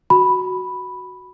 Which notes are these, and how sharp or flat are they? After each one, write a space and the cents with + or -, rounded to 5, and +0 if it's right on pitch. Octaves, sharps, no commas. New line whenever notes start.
F#4 +0 B5 +0